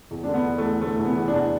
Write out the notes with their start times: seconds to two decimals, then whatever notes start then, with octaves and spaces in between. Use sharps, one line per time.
0.11 E2
0.24 D3 D4
0.34 B3
0.46 E2
0.58 A3
0.64 E2
0.81 D3 A3
0.96 E2 A3
1.05 B3
1.17 E2
1.28 D4
1.34 E2